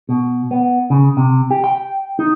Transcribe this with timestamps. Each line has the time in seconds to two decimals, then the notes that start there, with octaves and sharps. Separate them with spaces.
0.09 B2
0.51 B3
0.90 C#3
1.17 C3
1.51 G4
1.64 G5
2.19 D#4